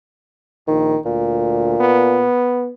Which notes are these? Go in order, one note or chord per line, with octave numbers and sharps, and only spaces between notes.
A#1 D#3
D2 A#2
B3